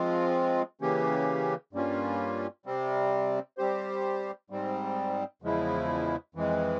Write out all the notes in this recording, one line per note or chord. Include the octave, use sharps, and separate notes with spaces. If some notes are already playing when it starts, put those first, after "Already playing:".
Already playing: F3 G#3 C4 F4
C#3 E3 A#3 C#4 G4
G2 G3 A#3 C#4 F4
C3 G3 C4
G3 C4 G4 C5
G#2 G3 C4
E2 C#3 F3 G#3 E4
F2 E3 G#3